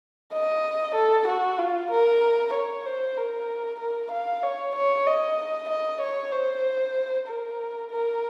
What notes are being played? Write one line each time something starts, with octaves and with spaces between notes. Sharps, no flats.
D#5
A4
F#4
F4
A#4
C#5
C5
A#4
A#4
F5
C#5
C#5
D#5
D#5
C#5
C5
A#4
A#4